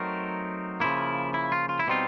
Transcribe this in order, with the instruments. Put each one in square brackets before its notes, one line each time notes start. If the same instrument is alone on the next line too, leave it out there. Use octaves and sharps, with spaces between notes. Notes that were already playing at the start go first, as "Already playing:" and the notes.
Already playing: [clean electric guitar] F#3 A3 C4 D#4 A#4
C#3 F3 A#3 E4
E4
F4
F4
E4
B2 G3 C4 D#4 F4